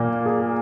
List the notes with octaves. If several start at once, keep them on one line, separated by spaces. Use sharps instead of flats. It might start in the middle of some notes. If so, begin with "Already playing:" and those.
Already playing: A#2 A#3
G#4